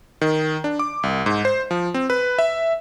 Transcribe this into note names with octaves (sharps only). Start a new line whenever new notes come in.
D#3
D4
D6
C2
G#2
C5
F3
C4
B4
E5